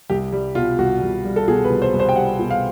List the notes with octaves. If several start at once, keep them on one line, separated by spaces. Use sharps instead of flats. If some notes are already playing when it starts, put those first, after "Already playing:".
C2 G4
G3
B2 F4
C2 F#4
C2
G3
A4
B2 G#4
B4
C2
C5
C2
C5
G5
G3 F#5
B2
F5